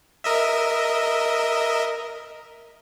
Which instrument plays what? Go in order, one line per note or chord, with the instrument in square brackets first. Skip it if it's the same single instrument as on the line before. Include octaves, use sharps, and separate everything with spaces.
[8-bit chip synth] A#4 D#5 E5